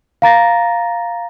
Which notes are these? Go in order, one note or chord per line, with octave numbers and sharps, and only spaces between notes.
F5 A#5 A6 A#6